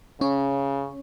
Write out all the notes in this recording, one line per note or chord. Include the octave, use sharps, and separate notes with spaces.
C#3 C#4